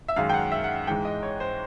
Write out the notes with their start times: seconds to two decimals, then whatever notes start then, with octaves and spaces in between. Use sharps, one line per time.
0.08 E5
0.16 F#2 D#3 G#3 F5
0.29 G5
0.34 F#5
0.52 E5
0.64 F#5
0.87 G#2 E3 G#3 G5
1.05 D#5
1.23 C#5
1.40 C5